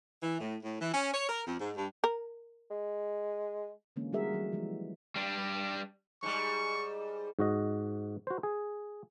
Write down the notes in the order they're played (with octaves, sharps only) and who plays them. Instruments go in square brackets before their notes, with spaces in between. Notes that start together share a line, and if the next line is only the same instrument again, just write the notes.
[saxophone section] E3
A2
A2
E3
C#4
C#5
A#4
F2
G#2
G2
[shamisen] A#4
[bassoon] G#3
[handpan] D3 E3 G#3 A#3 C#4
G3 G#3 F#4 G#4 A#4 E5
E3 F#3 G3
E3 F3 G#3
[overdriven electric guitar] G3 D4
[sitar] G#2 G3 [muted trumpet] C#6
[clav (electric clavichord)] G#2 F#4 D#5
F#4 C5
G#4